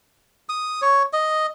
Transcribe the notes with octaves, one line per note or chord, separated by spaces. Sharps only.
D#6
C#5
D#5